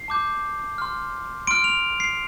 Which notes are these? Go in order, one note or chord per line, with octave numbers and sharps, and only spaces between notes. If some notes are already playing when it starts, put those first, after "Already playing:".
Already playing: C7
A5 D6 G6
C6 F6
C6 F6 D7
F7
C7